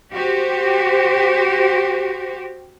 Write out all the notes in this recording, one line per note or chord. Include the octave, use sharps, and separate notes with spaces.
F#4 G4 C5